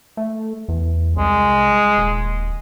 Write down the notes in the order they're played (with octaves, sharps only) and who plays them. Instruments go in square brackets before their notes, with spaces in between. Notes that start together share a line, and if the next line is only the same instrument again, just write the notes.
[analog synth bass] A3
E2
[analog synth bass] C2 [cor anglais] G#3
[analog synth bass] D#1